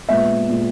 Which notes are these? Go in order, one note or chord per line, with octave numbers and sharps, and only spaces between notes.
A#2 G#3 B3 E5
A#2 G#3 B3